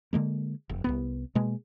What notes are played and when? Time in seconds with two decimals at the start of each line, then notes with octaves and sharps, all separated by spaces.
0.13 D3 D#3 G#3 A#3
0.69 F1
0.84 C2 F2 B3
1.35 B2 G#3 A#3